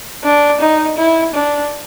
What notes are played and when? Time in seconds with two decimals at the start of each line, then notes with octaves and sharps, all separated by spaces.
0.24 D4
0.60 D#4
0.98 E4
1.34 D4